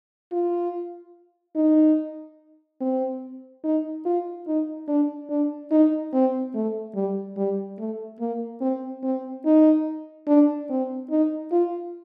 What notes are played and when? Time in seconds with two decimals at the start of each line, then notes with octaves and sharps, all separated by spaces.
0.32 F4
1.55 D#4
2.81 C4
3.64 D#4
4.05 F4
4.47 D#4
4.88 D4
5.29 D4
5.71 D#4
6.13 C4
6.55 A3
6.95 G3
7.37 G3
7.79 A3
8.20 A#3
8.61 C4
9.03 C4
9.45 D#4
10.28 D4
10.70 C4
11.10 D#4
11.52 F4